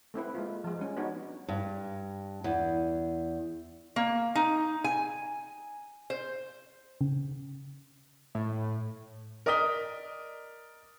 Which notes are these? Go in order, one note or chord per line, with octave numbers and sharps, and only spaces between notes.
A3 C4 E4 B4
G#3 A#3 F4
F3 G#3
G3 C#4
B3 D4 D#4 F#4 C#5
G2
E2
A#3
D#4
G#5
C5
C#3
A2
A#4 D5 D#5 D#6 B6 G7